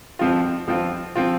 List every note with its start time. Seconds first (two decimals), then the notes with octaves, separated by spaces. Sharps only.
0.19 F2 F3 C4 F4
0.67 F2 F3 C4 F4
1.15 F3 C4 F4